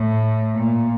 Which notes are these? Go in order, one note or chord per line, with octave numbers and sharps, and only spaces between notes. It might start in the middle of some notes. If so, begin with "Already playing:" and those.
Already playing: A2
A#2